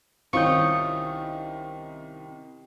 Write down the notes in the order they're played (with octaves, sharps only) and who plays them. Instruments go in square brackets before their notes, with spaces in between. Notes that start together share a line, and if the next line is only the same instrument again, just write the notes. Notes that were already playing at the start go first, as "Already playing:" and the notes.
[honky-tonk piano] C2 D#3 [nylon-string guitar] C4 C#4 F4 [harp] C#6 D#6 G6